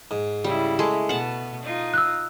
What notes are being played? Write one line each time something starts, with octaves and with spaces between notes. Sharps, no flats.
G#2
C#3 G3 E4
G#3 A3
B2 B3 F#5 A5
D#4 F4
E6 F#6